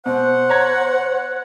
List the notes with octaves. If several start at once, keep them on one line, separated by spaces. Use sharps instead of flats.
B2 C5 F#5
C#5 A#5 G#6